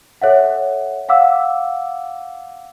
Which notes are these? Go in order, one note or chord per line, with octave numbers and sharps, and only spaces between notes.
A4 C#5 E5 F#5
F5 F#5 D6 E6